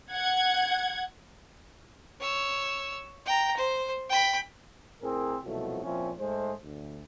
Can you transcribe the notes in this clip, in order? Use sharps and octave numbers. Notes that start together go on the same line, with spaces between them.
F#5 G#6
C#5 E6
G5 A#5
C5
G5 B5
A2 C4 G#4 A#4
C2 B2 F3 F#3 A3
A#2 F3 C4 C#4 E4
G#2 G#3 A3 C5
D2